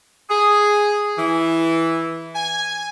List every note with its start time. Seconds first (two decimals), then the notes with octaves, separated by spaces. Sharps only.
0.29 G#4
1.18 E3
2.35 G#5